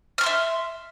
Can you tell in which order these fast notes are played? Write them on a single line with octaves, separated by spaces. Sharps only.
F6 C#6 C6 E5